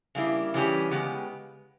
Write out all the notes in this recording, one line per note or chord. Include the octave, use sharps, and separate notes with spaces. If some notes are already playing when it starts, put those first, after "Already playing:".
C#3 G3 A#3 E4
C#3 E3 G3 C#4 G4
C#3 G#3 B3 G4